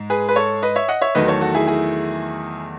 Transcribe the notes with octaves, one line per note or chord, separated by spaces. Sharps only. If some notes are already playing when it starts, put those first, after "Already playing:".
Already playing: G#2 G#3
G#4 B4
B4
A4 C#5
B4 D#5
C#5 E5
D#5 F#5
C#5 E5
E2 D#3 F#3 A3 B4 D#5
A4 C#5
F#4 A4
E4 G#4
E4 G#4